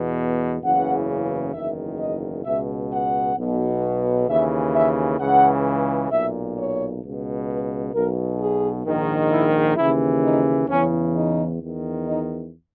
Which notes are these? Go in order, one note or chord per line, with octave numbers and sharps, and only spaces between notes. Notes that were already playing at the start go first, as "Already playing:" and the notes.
Already playing: E2 B2
F#1 E2 C#3 E3 F#5
F#1 E2 D#3 E5
D#5
C#2 B2 E5
F#5
B1 B2
D#2 C#3 E3 E5
E5
C#2 C#3 E3 F#5
B1 A#2 E5
C#5
C#2 B2
B4
B1 B2 A#4
G#4
A#1 G#2 D#3
E4
D#2 C#3 E3 E4
D#4
E2 C#3 E3 C#4
D#4
E2 D#3
D#4